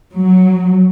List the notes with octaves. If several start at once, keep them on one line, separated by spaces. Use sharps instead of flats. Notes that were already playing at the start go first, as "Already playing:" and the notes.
F#3